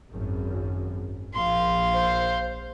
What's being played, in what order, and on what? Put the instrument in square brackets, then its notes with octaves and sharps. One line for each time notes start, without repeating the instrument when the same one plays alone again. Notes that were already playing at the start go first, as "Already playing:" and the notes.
[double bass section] G#1 F#2
[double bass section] A#1 [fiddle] F5 C6
[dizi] C5